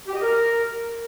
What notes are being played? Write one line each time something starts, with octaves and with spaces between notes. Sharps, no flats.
G4
D#5
A#4